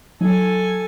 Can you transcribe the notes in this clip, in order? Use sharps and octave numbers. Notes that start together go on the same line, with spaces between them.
F#3 D#4 A4 G#5